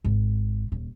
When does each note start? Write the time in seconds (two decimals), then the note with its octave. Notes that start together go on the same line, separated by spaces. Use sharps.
0.04 G#1
0.72 D#1